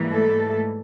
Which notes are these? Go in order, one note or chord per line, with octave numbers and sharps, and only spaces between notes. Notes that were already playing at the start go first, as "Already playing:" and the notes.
Already playing: G#2 E3 G3 A#3
A3 A4